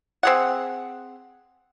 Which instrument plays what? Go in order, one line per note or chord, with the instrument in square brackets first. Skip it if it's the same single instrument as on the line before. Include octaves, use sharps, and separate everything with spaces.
[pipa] C4 G#4 F#5